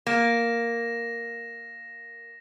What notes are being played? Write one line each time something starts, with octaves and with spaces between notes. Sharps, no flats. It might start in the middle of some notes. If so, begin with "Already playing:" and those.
A#3 A#6 E7